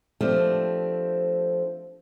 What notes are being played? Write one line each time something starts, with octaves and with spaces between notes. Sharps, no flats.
F3 A3 C4 D4 G4